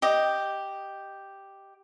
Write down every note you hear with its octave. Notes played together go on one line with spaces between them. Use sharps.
G4 D#5